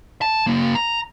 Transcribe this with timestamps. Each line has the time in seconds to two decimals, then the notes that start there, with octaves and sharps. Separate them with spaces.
0.22 A5
0.47 C#3 A#3
0.75 A#5